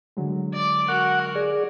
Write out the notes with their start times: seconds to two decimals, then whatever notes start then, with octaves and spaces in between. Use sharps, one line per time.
0.17 D3 F#3 G#3
0.53 D5 D6
0.88 F#4 A#4 F#5 C#6 F#6
1.35 G#4 D5